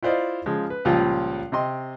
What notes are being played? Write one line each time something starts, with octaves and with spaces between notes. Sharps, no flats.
E4 F4 C5 D5 D#5 F5
C#3 F3 G#3
B4
C#2 A#2 F3 G3 F4
C3 C4 D#5 C6